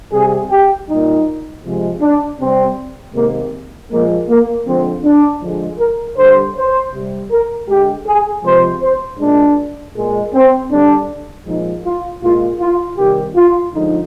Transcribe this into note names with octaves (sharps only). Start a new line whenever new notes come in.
C3 G3 G#4
G4
A#2 G3 D#4
C3 F3 G#3
D4
C3 G3 C4
C3 D#3 G#3 A#3
A#2 F3 G#3 A#3
A#3
D3 F3 G#3 C4
D4
D3 F3 G#3
A#4
D3 G3 C5
C5
C3 G3
A#4
D3 G#3 G4
G#4
C3 F3 G#3 C5
C5
A#2 G#3 D4
A#2 G#3
C4
D3 G3 D4
A#2 F3 G#3 D#4
F4
A#2 G#3 F4
F4
C3 D#3 G3 G4
F4
D3 F3 G#3 D#4